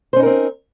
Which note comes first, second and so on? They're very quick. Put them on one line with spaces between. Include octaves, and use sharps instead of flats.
C5 C#4 D#4 A#4 C4